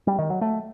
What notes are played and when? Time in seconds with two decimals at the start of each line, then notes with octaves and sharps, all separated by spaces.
0.07 G3
0.19 D#3
0.30 F#3
0.41 A3